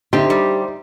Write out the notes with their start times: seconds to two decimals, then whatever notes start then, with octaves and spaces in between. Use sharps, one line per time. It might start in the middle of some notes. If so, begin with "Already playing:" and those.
0.13 D3 C4 D#4 G4 C5 E5 C6
0.30 G3